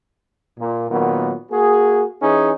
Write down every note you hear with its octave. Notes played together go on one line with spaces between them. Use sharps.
A#2
A#2 D#3 F#3 B3
A#3 F#4 G#4
E3 C#4 D#4 G#4